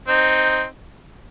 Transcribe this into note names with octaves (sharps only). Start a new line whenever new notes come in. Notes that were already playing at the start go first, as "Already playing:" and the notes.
C4 D#4